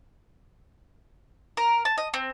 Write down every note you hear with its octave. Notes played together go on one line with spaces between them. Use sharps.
A#4
A5
D#5
C4